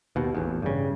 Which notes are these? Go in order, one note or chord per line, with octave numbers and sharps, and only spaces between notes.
D#2 B2
A1 E2
G2 C#3